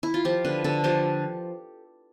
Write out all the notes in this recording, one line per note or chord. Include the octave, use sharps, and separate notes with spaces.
E4
F4
F3 G4
D3 B4
D3 A4
F3 G4